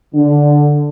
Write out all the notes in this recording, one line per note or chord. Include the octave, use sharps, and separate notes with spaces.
D3 D4